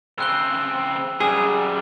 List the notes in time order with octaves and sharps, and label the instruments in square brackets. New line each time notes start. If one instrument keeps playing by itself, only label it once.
[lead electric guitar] C#3 C4 [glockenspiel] E6 F#6 G7
[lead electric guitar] F#2 G3 [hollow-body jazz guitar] G#4